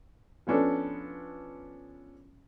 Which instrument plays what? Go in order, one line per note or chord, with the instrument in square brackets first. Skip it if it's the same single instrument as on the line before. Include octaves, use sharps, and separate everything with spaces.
[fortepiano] F3 B3 C#4 D4 A4